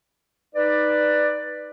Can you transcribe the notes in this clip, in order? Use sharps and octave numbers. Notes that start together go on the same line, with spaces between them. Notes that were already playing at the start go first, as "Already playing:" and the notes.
D#4 B4 D5